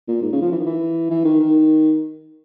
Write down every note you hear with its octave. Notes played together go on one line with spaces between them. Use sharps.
A#2
G#2
C#3
F3
E3
D#3
E3
E3
D#3
D#3